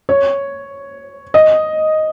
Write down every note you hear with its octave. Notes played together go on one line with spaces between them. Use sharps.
C#5
D#5